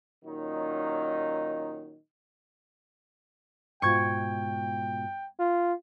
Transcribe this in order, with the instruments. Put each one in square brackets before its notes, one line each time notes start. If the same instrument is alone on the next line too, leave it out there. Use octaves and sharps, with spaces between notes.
[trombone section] A#2 D#3 F#3 C#4 D#4
[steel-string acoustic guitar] G#2 B2 F4 [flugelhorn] G5 [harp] C#6 G#6
[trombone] F4